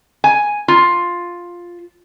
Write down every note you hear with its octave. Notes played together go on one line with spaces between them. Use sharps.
G#5
F4